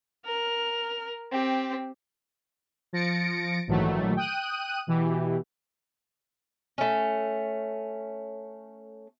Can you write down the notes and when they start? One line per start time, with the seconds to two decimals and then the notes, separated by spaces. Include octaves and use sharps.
0.25 A#4 F6
1.32 C4 G4
2.93 F3 A6 A#6 C#7 D7
3.67 A#1 G#2 D#3 E3 F#3 A3
4.16 G5 D#6 F#6 D#7
4.87 B2 E3 G4
6.78 A3 C#4